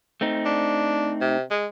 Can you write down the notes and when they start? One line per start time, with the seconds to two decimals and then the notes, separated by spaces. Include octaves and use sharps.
0.21 A3 C4 D#4
0.45 D4
1.21 C3
1.51 G#3